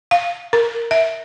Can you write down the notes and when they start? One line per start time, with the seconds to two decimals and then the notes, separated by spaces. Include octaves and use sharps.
0.11 F5
0.53 A#4
0.91 E5